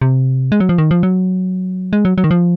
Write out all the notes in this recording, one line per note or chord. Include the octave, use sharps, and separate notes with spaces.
C3
G#3
F#3
F3
D#3
F3
F#3
G#3
F#3
F#3
D#3
F3